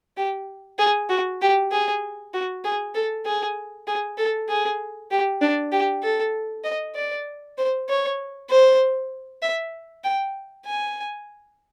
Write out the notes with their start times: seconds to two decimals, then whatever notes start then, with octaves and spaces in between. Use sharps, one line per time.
0.17 G4
0.79 G#4
1.10 F#4
1.41 G4
1.71 G#4
2.33 F#4
2.64 G#4
2.94 A4
3.25 G#4
3.87 G#4
4.18 A4
4.49 G#4
5.11 G4
5.41 D4
5.72 G4
6.03 A4
6.64 D#5
6.95 D5
7.58 C5
7.89 C#5
8.49 C5
9.42 E5
10.04 G5
10.66 G#5